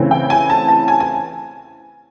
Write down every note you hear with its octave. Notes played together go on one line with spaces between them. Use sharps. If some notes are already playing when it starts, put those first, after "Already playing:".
Already playing: C#3 E3 A3 C4
G5
G#5
A5
A5
G#5
G#5